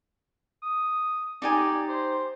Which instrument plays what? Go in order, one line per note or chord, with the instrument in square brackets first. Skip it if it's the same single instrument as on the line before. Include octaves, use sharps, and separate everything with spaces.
[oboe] D#6
[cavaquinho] D#4 G4 G#5 [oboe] D5
[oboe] C5